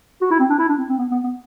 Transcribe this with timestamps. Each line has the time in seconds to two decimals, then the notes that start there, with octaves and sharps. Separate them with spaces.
0.21 F#4
0.30 E4
0.39 C4
0.50 D4
0.59 E4
0.69 D4
0.78 C4
0.89 C4
0.98 B3
1.11 B3
1.24 B3